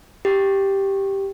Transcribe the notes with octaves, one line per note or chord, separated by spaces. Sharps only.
G4